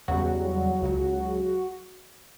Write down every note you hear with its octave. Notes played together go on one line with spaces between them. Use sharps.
E2 C#3 F#3 G3 F#4
C#2 C#3 F#3